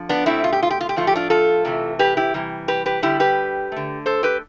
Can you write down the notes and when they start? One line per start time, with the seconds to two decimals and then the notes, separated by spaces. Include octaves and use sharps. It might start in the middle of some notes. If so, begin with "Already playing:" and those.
Already playing: D3 F3
0.09 B3 D4
0.26 B2 A3 C4 E4
0.44 F4
0.52 G4
0.63 F4
0.71 G4
0.81 F4
0.89 G4
0.96 A2 F3 A3 F4
1.07 G4
1.15 D4 F4
1.30 F4 A4
1.65 C3 E3 A3
1.99 G4 B4
2.17 E4 G4
2.34 C3 E3 G3
2.68 G4 B4
2.86 G4 B4
3.02 D3 G3 E4 G4
3.20 G4 B4
3.72 D3 A3
4.06 A4 C5
4.23 G4 B4